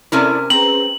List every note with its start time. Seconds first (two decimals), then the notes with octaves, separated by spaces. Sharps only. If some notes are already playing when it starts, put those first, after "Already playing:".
0.12 C3 C#4 E4 A4 A#4 D5
0.50 C4 C#4 G#4 B4 A#5 F#7